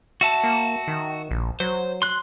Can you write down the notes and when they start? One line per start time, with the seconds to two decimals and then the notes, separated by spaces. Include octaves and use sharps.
0.21 F#4 E5 A5
0.44 A#3
0.88 D#3
1.31 A#1
1.60 F#3 C5
2.02 C6 F#6